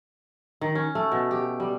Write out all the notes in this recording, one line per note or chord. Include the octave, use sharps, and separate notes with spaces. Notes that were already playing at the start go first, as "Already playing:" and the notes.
D#3
C#4
A3
B2
G4
G3